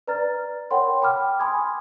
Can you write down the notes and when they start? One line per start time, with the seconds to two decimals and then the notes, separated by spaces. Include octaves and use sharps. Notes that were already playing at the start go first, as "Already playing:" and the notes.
0.08 B4 D5 A#5 F6 A6
0.71 A#4 C#5 F#5 G5 B5 C6
1.02 G5 B5 D6 F6
1.40 G#5 B5 C6 D6 D#6 G#6